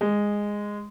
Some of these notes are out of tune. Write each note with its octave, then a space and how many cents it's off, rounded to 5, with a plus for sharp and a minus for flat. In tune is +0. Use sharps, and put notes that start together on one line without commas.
G#3 -10